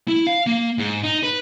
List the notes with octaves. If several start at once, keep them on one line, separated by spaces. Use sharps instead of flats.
E4
F5
A#3
G#2
D#4
B4